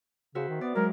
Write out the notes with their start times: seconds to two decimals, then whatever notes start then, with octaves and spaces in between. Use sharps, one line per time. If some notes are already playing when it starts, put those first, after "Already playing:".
0.35 C#3 F#4 C5 E5
0.49 D#3
0.61 B3 D5
0.75 F#3 G#3 A#4